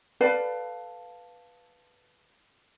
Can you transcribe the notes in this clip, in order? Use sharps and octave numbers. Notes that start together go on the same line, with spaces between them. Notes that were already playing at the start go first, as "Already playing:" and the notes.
A4 B4 D5 F5